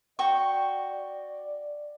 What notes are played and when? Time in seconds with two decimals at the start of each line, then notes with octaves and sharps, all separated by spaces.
0.19 F#4 D5 G5 C#6